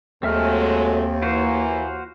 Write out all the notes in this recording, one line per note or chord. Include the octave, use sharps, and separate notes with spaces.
D#2 F#3 G#3 A3 C4 E5 F6
E3 A#3 F4 F#4 C5